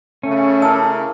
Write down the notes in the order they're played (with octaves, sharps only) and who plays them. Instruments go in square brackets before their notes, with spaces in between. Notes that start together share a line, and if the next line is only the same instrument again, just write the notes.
[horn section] C#3 A3 [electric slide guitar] C#4
[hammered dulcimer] D4 E4 A#4 [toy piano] D#5 A5 E6